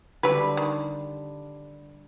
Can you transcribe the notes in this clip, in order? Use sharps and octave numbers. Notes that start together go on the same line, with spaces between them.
D3 F#3 G3 B4 D5
D#3